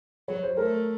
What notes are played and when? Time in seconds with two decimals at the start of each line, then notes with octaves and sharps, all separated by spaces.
0.28 F#3 C#5
0.43 C5
0.57 A3 A#4